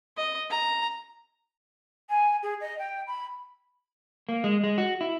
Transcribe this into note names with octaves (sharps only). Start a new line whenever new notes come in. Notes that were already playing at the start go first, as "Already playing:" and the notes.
D#5
A#5
G#5
G#4
D#5
G5
B5
A#3
G#3
G#3
F#4
E4